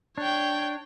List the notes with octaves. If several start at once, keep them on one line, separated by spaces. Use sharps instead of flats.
D4 C#5 G5